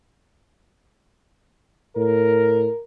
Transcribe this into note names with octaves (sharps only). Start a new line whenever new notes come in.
A2 A#4